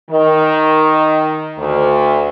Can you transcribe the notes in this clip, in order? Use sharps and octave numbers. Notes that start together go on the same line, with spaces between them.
D#3
D2